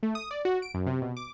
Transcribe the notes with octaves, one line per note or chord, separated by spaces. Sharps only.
A3
D#6
D5
F#4
D7
F#2
C3
B2
D6